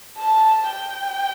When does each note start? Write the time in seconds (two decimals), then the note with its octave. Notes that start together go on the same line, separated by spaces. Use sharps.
0.18 A5
0.70 G5